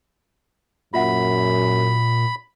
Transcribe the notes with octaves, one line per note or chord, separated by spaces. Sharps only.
F#2 A#2 F4 E5 F#5 B5